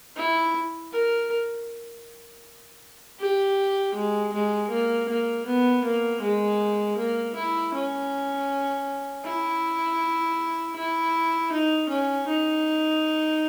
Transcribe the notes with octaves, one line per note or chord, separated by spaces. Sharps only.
E4
A#4
G4
G#3
G#3
A#3
A#3
B3
A#3
G#3
A#3
E4
C#4
E4
E4
D#4
C#4
D#4